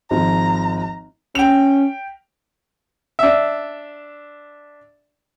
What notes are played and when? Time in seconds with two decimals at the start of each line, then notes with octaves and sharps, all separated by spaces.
0.11 G#1 F3 A#5
1.35 C#4 G5 F7
3.19 D4 E5